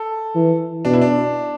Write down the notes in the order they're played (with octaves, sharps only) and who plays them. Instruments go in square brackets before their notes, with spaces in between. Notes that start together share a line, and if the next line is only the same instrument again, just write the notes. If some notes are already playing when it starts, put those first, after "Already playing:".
Already playing: [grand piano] A4
[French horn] E3
[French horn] B2 [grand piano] D4
[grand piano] E4
D4